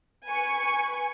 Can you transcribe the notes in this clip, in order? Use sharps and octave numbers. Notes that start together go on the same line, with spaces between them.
B4 G#5 C#6